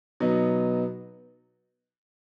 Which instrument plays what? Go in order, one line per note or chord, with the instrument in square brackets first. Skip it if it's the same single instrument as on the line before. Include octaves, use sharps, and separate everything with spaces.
[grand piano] B2 F#3 B3 D#4